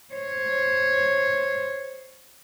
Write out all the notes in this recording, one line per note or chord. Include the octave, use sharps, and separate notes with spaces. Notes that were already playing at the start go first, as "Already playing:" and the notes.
C5 C#5